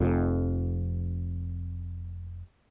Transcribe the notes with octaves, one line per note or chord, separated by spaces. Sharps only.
F1 F2